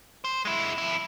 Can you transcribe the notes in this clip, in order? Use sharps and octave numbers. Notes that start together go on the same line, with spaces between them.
C5
G#3 E4
F2 E4